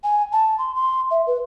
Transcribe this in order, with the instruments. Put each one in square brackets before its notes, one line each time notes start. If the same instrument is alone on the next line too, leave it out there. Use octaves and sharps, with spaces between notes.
[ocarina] G#5
A5
C6
C6
E5
B4